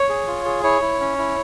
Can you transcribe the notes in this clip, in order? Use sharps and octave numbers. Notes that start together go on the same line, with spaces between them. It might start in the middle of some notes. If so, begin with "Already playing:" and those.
Already playing: C#5
G#4
F4
G#4
E4 C#5
E4
C#4
E4